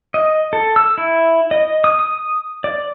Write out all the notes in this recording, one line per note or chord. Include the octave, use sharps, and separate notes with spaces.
D#5
A4
E6
E4
D#5
D#6
D#6
D5